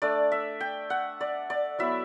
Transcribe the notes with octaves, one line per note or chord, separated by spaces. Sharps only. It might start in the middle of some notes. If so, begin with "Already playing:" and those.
A3 D4 D5
E5
G5
F#5
D5
D5
F#3 B3 E4 E5